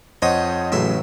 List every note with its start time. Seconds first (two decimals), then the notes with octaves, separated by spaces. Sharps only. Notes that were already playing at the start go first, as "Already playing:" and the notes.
0.22 F2 C5 C#5 D#5 F#5 D#6
0.72 A1 C#3 F#3 A3 E5 C6